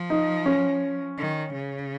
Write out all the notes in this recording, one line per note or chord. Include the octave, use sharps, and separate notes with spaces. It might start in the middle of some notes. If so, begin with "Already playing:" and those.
Already playing: F3
D#4
C#4
D#3
C#3